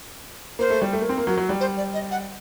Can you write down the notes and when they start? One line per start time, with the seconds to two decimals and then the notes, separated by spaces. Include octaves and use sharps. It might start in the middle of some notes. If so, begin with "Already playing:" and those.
0.59 A#3 C5
0.70 A3
0.82 G3
0.93 A3
1.02 A#3
1.09 C4
1.18 A#3
1.27 F#3 A#4
1.37 F#3
1.49 G3
1.60 C5
1.77 D5
1.94 D#5
2.11 F#5